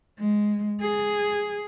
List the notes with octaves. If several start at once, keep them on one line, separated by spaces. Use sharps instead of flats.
G#3
G#4